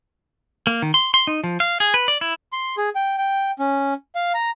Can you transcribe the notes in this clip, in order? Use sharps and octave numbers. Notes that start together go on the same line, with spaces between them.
A#3
D#3
C6
C6
D#4
F3
F5
G#4
B4
D5
E4
C6
G#4
G5
G5
C#4
F5
A#5